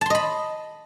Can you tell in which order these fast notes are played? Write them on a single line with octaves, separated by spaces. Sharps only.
A5 C6 D#5 B5